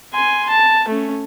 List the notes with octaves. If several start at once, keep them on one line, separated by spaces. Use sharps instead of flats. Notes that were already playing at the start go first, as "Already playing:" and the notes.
G#5 C6
A5
A3 C#4